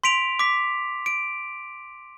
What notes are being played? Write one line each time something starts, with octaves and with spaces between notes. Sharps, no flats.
C6 B6 D7 F7
D6 B6
D7